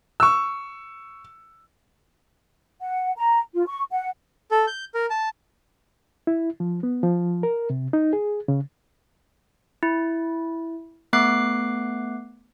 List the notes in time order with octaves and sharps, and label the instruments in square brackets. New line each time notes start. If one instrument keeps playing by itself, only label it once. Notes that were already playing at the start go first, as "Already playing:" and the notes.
[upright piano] C#6 E6
[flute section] F#5
A#5
F4
C#6
F#5
[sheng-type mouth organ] A4
G6
A#4
A5
[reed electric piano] E4
F3
B3
F3
A#4
C3
D#4
G#4
C#3
[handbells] E4
A3 B3 D6 F#6 C7